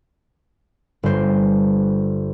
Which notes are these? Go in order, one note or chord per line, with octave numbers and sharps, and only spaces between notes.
G1 C5